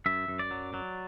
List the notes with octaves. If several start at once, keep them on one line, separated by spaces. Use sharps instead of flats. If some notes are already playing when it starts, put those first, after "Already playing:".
F#2 E5
F#2
D5
F#3
F#3